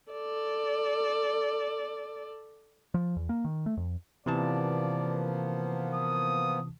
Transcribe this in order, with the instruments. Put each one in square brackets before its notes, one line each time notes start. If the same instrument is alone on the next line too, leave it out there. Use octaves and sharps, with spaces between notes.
[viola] A4 D5
[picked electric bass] F3
E2
A#3
D#3
A3
F2
[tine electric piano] C3 E3 A5 [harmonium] F3 A#3 B3 [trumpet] D5
[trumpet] D#6